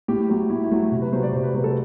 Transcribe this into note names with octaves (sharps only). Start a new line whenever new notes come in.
A2 G4
F#3 A3
A2 E4
E4
F#3 A3
C3
B4
F#3 A3 C5
D5
C3 C5
B4
F#3 A3 B4
A4